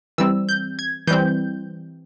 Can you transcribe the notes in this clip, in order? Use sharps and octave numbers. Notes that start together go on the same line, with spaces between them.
E3 G3 C4 E6
G6
G#6
E3 G3 C4 G6